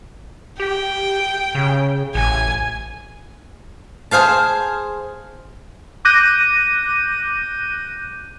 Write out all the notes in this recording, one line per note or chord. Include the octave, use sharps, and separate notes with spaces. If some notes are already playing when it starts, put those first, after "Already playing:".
G4 G5
C#3
A1 G#5
G#4 C5 F5 A5
D6 F#6 G6 A#6 D#7